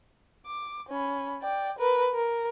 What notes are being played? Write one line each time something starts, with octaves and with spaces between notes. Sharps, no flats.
D6
C#4 B5
D5 G5
A#4 B4
A#4